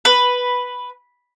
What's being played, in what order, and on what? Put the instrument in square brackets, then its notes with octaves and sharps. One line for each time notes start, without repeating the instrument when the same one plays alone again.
[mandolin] B4